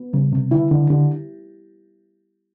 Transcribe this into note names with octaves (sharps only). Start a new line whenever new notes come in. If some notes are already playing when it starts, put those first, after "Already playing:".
Already playing: B3
C#3 G3
C3
D3 E4
D3
D3 G4